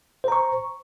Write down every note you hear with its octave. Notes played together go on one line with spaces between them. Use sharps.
C5 A#5 C#6